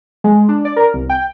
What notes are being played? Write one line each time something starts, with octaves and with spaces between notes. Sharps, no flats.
G#3
D4
D5
A#4
C2
G5